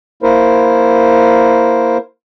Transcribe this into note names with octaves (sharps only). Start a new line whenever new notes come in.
A#3 E4 A#4 C5